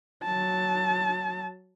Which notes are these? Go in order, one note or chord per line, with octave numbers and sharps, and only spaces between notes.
F#3 A5